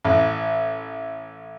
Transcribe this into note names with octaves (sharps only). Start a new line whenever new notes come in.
A1